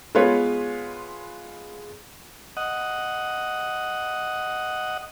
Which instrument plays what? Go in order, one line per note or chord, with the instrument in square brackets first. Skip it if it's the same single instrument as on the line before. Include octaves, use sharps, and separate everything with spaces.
[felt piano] G#3 B3 F4 B4 C#5
[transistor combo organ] D#5 F#5